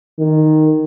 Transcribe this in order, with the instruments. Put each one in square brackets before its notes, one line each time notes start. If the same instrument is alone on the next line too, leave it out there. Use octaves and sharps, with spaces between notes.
[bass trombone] D#3